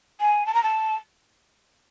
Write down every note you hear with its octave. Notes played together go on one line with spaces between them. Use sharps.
G#5
A5
A#5
A5